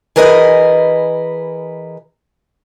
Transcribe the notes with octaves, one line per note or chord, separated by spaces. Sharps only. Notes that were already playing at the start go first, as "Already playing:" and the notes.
E3 G#4 A#4 B4 D#5